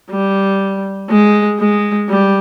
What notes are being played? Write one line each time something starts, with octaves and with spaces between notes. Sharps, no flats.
G3
G#3
G#3
G3